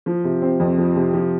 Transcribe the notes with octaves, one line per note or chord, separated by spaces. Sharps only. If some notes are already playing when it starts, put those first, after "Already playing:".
F3
C3
C4
F2
F3
C3
F3